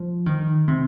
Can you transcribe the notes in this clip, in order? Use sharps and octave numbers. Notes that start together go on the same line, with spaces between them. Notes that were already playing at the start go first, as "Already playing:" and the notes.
Already playing: F3
D#3
C3